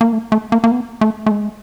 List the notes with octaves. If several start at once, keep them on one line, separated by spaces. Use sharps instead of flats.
A#3
A3
A3
A#3
A#3
B3
A3
A3
G#3